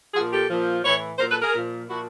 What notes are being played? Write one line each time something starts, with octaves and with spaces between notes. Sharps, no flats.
A#2 F3 F#4 G#4
G4 A4
A#2 F3
A2 E3 B4 C#5
A#2 F#3 A#4 C5
A4 B4
G#4 A#4
A#2 F3
A#2 F3 E4 F#4